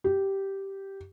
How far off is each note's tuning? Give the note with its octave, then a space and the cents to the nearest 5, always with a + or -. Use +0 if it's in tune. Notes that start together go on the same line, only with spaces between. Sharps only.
G4 -10